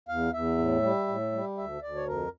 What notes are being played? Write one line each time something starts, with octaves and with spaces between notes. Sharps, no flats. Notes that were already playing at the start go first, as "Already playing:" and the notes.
E2 F5
E2 E5
A2
G3
A2
G3
D2 E5
D2 D5
C#5
F2 A#4